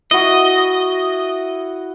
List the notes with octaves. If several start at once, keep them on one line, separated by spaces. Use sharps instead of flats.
E4 F#4 D#5